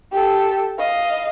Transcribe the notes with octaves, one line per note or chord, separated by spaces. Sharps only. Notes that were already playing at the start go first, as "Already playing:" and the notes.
G4 A4
D#5 F5